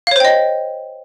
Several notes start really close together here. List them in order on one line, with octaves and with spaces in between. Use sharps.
F5 C#5 C5 G5 D#5